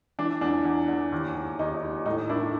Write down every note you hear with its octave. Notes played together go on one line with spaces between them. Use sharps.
E3 D4
E2 D4
E2
E2
D#2
D#2
D#2 D#4
D#2
A2 D#4
A#3 D4 E4